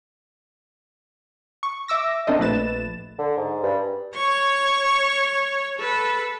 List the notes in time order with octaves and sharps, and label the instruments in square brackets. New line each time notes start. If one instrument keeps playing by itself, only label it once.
[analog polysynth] C#6
E5 D6 E6 A#6
A#3 C4 D4 A4 C5 D#5
A#1 A3 B4 A6 E7
[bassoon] D3
G#2
G2
[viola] C#5 C#6
A4 B4